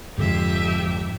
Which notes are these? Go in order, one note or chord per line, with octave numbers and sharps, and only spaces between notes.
F2 G#2 D3 G4 E5